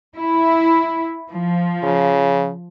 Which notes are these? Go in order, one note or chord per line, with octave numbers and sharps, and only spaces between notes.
E4
F3
C#3